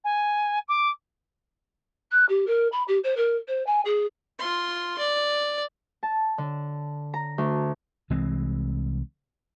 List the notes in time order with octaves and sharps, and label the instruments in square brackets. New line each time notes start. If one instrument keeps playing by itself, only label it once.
[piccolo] G#5
D6
[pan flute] F#6
G4
A#4
B5
G4
C5
A#4
C5
G#5
G#4
[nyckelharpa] F4 C6
D5
[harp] A5
D3
A#5
D2
[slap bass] C2 E3 G#3 C4